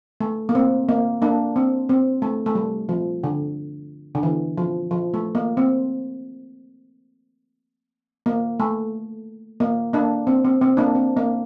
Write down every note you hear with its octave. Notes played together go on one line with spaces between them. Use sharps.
A3
A#3
C4
A#3
A#3 D4
C4
C4
A3
A3
G3
F3
D3
D3
E3
F3
F3
A3
A#3
C4
A#3
A3
A#3
A#3 D4
C4
C4
C4
A#3 D4
C4
A#3